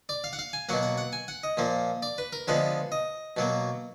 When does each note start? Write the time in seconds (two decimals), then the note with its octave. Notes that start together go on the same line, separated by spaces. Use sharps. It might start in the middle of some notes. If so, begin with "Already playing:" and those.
0.09 D5
0.24 F5
0.33 F#5
0.39 F5
0.53 G#5
0.69 B2 F#3 A#3 F#5
0.83 F#5
0.98 F#5
1.13 G#5
1.28 F#5
1.43 D#5
1.57 A#2 F3 A#3
2.03 D5
2.18 B4
2.33 A#4
2.48 D3 F3 G#3 B3 B4
2.92 D#5
3.37 B2 F#3 A#3